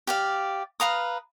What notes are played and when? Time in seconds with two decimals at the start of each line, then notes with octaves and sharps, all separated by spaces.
0.07 G4 D5 F5
0.80 B4 F5 A#5 D#6